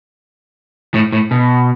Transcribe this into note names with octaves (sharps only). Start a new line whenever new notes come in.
A2
A2
B2